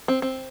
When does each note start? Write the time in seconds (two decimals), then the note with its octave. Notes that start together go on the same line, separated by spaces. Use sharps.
0.08 C4
0.22 C4